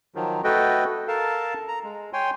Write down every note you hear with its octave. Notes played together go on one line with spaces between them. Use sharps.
D#3 F3 F#3
A3 F#4 A4 B4 D#5 G5
A4 A#4 F5 A5
A#5
G#3
C#5 G5 G#5 C6